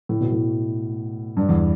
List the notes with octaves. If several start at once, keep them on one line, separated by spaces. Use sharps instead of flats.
A2
B2
A2
G2
E2